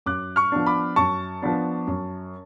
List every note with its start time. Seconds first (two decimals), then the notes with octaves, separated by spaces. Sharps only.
0.06 F#2 D6 F#6
0.36 C#6 F6
0.52 F3 B3 D4
0.66 B5 D6
0.96 F#2 A5 C#6
1.42 F3 B3 D4
1.87 F#2